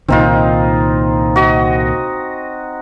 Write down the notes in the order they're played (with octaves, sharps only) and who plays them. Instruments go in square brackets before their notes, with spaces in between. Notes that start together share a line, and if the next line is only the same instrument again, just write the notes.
[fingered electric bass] C2 A#2 D#3 [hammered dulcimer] C4 D#4 F4
[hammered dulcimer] F#4 D#5